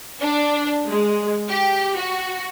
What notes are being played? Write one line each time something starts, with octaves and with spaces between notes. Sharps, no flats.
D4
G#3
G4
F#4